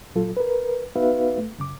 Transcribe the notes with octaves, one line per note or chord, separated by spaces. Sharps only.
A#2 F#3 F4 A4
A#4 B4
B3 D#4 F#4 B4 E5 F5
A3
F#2 C#3 D6